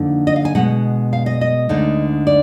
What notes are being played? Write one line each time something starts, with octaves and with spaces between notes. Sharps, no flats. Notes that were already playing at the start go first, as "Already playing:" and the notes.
Already playing: F2 D3 A#3 D#4
D#5
F5
G#5
B2 G#3 B3 F#5
F5
D#5
D#5
D2 D3 G#3 D#4
D5